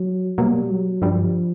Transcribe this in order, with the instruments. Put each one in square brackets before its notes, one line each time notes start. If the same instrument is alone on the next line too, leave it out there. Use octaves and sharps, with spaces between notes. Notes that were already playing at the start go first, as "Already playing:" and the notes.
Already playing: [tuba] F#3
[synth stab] B2 F#3 A#3 [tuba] G3
[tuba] F#3
[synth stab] G2 D3 G3 [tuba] F3